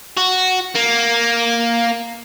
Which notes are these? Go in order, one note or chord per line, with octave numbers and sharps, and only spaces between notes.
F#4
A#3